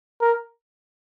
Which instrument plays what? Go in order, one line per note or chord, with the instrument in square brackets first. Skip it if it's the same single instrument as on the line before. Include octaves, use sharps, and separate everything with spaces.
[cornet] A#4